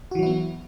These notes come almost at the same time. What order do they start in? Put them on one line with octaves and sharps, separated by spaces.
F#4 E3 F#3 E4 B3